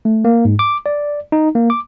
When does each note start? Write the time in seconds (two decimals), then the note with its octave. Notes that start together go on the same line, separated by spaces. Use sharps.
0.05 A3
0.25 A#3
0.45 G#2
0.59 D6
0.86 D5
1.32 D#4
1.55 A#3
1.70 D6